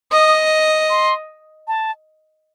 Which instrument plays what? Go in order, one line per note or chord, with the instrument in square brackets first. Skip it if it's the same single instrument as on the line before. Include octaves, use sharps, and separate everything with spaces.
[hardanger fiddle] D#5 [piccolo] D#6
[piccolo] C6
A5